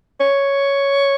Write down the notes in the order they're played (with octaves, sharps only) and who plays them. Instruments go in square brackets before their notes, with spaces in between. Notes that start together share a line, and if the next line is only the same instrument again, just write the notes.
[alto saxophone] C#5